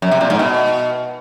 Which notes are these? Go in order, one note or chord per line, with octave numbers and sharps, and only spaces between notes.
F#2
C3
A#2
G#2
B2